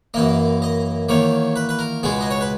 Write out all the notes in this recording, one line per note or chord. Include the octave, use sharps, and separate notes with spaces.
F#2 E3 A#3 D#5
D#5
E2 D#3 A#3 C#5
B4
B4
A#4
C#2 B2 G#3 B3 G#4
D#5
C#5
B4